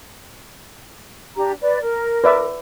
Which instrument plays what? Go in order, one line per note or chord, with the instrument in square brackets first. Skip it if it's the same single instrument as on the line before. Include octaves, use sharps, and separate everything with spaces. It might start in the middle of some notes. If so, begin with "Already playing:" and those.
[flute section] D4 G4 A#5
B4 D5
A#4
[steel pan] B4 D5 E5